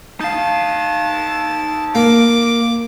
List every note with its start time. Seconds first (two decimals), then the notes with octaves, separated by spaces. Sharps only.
0.21 D#4 F5 A5
1.95 A#3 D6